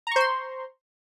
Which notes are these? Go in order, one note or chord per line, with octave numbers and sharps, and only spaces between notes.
C5 A#5 C6 C#6